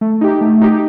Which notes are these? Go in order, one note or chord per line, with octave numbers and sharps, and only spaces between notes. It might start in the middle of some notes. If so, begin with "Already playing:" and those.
A3
D#4 G4
A3
D#4 G4